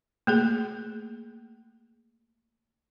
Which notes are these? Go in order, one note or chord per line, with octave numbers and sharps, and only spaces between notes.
A3 A#3 G#4